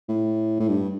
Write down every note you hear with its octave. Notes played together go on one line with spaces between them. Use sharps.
A2
A2
G2